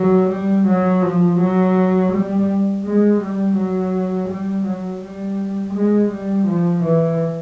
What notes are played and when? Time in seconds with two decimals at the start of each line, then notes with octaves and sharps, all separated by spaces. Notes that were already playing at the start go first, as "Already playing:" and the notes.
Already playing: F#3
0.29 G3
0.66 F#3
1.02 F3
1.39 F#3
2.12 G3
2.84 G#3
3.20 G3
3.56 F#3
4.28 G3
4.65 F#3
5.02 G3
5.73 G#3
6.10 G3
6.46 F3
6.83 E3